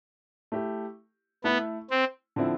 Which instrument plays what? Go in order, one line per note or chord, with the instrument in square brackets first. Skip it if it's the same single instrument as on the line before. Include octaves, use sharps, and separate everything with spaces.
[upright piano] A3 E4 G4
[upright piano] A3 E4 A4 [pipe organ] B3
[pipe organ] C4
[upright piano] D3 F3 C4 E4